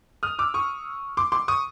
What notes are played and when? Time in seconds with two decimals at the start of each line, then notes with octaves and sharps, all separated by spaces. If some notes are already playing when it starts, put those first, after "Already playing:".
0.23 D#6 F6
0.39 D6 E6
0.54 C#6 D#6
1.17 C6 D6
1.32 C6 D6
1.48 C#6 D#6